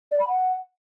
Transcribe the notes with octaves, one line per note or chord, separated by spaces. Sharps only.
D5
B5
F#5